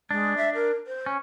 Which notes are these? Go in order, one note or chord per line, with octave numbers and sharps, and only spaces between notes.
G#3 D4
E5
A#4
C5
C#4